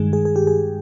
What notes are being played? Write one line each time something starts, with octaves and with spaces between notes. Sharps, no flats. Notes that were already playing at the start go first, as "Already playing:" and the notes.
Already playing: G2 D#3 G#3 G#4
G#4
G#4
G4
G#4